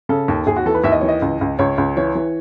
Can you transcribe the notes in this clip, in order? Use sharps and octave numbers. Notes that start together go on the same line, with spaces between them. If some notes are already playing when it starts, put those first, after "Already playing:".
C#3 A4
D#2
D#2 G#4
F#4
E3 A4
B4
D#2 E5
D#5
E3 C#5
D#5
C#2
C#2
C#2 C#5
C#2
E3 C#5
E3